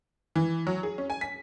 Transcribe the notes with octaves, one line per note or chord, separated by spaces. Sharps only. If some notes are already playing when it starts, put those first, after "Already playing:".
E3
F#3
G#4
C#4
G#5
B6